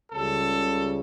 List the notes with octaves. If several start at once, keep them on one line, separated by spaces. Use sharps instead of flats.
C#2 C#3 G3 A4